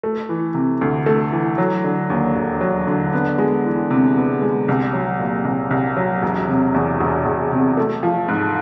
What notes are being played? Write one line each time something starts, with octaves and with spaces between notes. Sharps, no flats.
A3
E3
C3
D2
A3
E3
F#3
D3
D#2
E1
F#3
D3
B3
G#3
E3
C3
B3
G#3
C2
F#3
A#2
C2
C2
F#3
E1
C3
E2
E1
E1
C3
A3
F3
G#2